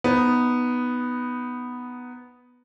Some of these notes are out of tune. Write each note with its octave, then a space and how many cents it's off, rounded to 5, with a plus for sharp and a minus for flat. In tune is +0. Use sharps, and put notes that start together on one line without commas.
B3 +0 D#4 +0